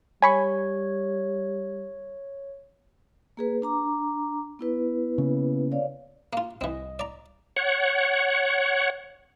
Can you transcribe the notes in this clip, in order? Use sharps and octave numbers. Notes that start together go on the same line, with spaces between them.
G3 C#5 G#5 B5 C#6
A#3 G#4 B4
D4 A#5 D6
B3 E4 B4
C#3 A#3
C#5 D5 F5
A#3 F4
C2 E3 C4 D#5
D5 A#5
C#5 F#5